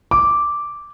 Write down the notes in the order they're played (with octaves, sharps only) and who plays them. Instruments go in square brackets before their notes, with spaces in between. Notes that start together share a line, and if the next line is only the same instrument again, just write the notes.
[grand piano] D6